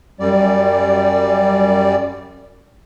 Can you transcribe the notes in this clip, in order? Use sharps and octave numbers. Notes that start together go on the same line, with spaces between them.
F#2 G3 D5